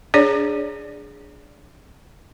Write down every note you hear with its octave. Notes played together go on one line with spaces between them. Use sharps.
D4 G#4 C#5 D5